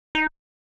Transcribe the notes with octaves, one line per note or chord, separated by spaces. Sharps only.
D#4